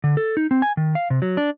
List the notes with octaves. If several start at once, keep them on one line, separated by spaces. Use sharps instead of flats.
D3
A4
D#4
C4
G#5
D#3
F5
C3
F#3
D4